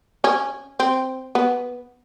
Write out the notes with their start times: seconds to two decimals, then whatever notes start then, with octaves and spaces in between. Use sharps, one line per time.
0.24 C#4
0.80 C4
1.35 B3